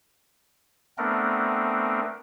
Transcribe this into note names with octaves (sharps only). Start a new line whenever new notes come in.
A3 B3 C4 D4 A#4